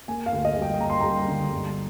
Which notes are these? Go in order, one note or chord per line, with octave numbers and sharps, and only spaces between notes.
A#3 G#5
F5
D2
D#5
G3
G5
A#3 A#5
C6
G3 A#5
D3
G1